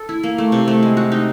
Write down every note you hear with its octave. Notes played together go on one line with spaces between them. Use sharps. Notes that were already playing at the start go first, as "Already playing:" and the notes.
Already playing: A4
E4
A#3
A3
C3
A3
G#3
F#4
D#4